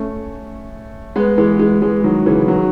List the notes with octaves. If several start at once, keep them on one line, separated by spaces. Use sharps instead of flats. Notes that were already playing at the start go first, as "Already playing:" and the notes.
Already playing: A3 C#4
G#3 B3
E3 G#3
E3 G#3
E3 G#3
D#3 F#3
C#3 E3
D#3 F#3